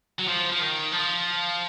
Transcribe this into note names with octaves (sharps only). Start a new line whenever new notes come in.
F#3
F3
F3
D#3
F3